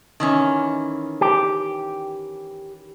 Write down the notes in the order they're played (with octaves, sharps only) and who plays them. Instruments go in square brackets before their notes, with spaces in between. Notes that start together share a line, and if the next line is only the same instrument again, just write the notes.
[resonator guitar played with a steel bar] D#3 E3 C#4
[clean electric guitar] G4